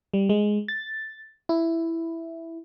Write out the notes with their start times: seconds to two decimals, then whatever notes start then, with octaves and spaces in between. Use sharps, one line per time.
0.14 G3
0.29 G#3
0.68 A6
1.49 E4